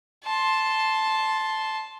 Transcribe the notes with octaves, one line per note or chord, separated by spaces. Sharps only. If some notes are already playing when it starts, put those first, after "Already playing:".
A5 C6